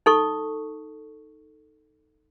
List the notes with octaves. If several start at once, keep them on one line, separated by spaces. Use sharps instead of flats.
D#4 A4 C#6